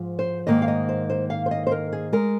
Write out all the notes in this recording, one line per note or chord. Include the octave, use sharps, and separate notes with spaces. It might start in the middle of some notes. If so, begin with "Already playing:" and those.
Already playing: G#2 F3
C5
G#2 D#3 A#3 D#5
F5
D#5
C5
C5
F5
C5
D#5
C5
A#4
G#4
G#3 A#4